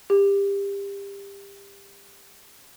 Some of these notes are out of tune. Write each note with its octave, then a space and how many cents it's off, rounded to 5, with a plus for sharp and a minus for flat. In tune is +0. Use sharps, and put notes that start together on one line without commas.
G4 +25